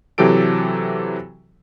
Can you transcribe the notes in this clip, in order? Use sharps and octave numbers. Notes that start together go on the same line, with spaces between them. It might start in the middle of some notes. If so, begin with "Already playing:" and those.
C3 E3 F#3 G4 A4 D7